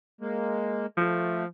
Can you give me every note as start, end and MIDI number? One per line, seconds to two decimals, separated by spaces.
0.21 0.86 56
0.21 0.86 58
0.98 1.46 53
0.98 1.44 57